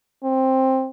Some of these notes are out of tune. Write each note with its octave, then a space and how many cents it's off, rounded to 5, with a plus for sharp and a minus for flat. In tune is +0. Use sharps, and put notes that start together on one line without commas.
C4 +10